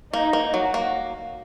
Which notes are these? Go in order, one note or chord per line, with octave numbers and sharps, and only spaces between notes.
A#3 D#4
A#3
F#3 F#4
A#3